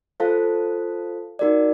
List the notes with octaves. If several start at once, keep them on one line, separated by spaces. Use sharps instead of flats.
F4 A4 C5 F5 A5
D#4 F#4 A#4 D5